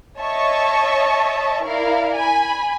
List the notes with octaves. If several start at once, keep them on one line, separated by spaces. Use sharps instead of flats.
C#5 D#5 E5 A5 C#6
E4 A#4 D5 F5
G#5 B5